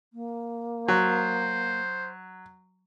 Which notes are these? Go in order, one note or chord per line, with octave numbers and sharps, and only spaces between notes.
A#3
F#3 C5